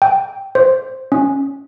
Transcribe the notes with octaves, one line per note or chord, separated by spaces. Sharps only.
G5
C5
C#4